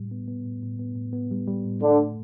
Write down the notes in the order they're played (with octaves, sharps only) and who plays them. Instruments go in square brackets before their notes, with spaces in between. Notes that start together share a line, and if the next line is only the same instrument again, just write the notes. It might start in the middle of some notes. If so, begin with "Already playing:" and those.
Already playing: [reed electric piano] A2 G3
B3
B3
A2
A2
B3
A2
B3
G3
G3
A2
[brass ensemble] D3 [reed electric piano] A3
[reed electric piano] A3